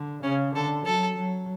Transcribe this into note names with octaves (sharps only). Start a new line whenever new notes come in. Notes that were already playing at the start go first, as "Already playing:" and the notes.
Already playing: D3
C#3 C#4
D3 A4
F#3 A4
F#3